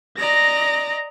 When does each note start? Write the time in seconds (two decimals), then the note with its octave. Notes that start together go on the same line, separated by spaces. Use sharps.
0.18 D5 D#5 A#5 A#6